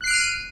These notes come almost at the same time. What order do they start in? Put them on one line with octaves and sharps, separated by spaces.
F#6 C7 D7 F6 D#7